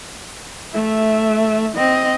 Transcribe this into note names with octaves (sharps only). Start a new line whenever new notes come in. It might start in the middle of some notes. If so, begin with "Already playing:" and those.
A3 E5
C4 D#5